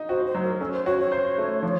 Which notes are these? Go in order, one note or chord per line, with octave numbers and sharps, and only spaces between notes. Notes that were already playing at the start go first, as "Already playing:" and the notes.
Already playing: D#4
F#4 C5
C5
F#3
A#4
C#4 A4
C5
F#4 C#5
C#5
C5
A3
F3